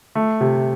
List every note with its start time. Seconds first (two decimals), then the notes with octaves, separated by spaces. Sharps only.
0.15 A3
0.41 C3